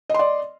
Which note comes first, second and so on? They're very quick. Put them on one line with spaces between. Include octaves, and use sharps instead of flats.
D#5 C6 D5